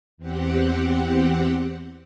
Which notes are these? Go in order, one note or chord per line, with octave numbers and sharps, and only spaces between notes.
E2 C4 G4 F#5